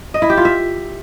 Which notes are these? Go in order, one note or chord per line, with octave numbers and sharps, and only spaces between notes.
D#5
E4
G4
F4
E5